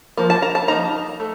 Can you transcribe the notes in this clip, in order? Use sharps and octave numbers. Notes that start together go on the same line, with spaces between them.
F3 A#3
A5
A#5
A5
F3 A#3 D#4 A#5
A3